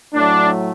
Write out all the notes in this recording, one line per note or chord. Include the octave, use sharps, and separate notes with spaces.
A2 F#3 A3 D4